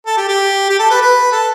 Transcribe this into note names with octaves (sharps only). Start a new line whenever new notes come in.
A4
G4
G4
G4
A4
B4
B4
A4